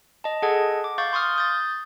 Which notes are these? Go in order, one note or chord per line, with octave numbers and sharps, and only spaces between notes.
D#5 A5
G#4 A4 D#5 F#5 A5 G#6
D6
F5 C#6 G6 A6
C6 C#6 D#6 F6
D#6 G6 A6